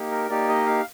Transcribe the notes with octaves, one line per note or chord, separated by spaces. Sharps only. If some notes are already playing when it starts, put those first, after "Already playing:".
Already playing: A#3 D#4 G4
A#4
A#3 D#4 G4 D5
D#5
F5